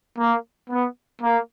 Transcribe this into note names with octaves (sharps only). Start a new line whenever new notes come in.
A#3
B3
A#3